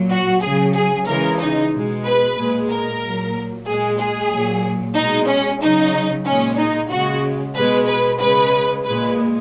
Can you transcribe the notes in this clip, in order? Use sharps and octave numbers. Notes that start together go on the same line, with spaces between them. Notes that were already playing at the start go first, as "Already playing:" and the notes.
Already playing: A#2 F#3
F#4
C#3 F#3 G#4
G#4
C#3 E3 G#3 A#4
D#4
B2 G#3
B4
A#2 G#3
A#4
A#2 F#3
A#2 G#3 G#4
G#4
A#2 F#3
B2 G#3 D#4
C#4
C#3 F#3 D#4
G#3 C#4
A#2
D#4
C#3 G#3 F#4
B2 G#3 B4
B4
C#3 G#3 B4
A#2 G#3 B4